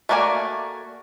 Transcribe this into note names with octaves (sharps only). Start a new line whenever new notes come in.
A3 A#3 F#4 D5 G#5